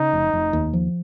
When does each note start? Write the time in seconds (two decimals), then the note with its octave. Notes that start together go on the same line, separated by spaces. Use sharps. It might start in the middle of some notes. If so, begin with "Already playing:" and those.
Already playing: C#3 D#4
0.13 F1
0.33 F1
0.53 D#2
0.73 F3